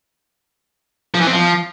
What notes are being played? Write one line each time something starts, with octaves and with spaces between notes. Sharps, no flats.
F3
E3
C4
F3